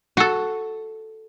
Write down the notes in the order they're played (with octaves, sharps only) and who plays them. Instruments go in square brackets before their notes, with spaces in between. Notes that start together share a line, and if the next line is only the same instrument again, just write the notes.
[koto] F#4 A4